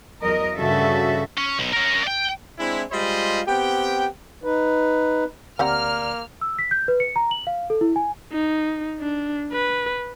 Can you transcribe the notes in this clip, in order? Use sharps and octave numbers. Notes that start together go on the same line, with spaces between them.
E2 F#3 A#4 D#5
G2 C#3 F#4 A4 E5
C#4
B1
C#4 A#4
D5 G5
G#3 C4 D4 E4
G3 G#3 F4 C5 D#5 B5
B3 C4 G4 G5
D#4 B4
D2 A#3 C4 G4 D5 F#5 A#5 F6
E6
B6
G6
B4
C#7
A#5
F#7
F5
A4
E4
G#5
D#4
D4
B4